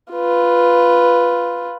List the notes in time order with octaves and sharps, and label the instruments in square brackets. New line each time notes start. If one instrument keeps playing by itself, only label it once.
[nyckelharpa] F4 B4